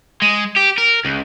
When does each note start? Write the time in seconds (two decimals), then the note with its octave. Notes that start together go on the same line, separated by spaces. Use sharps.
0.22 G#3
0.57 G4
0.78 A#4
1.05 C#2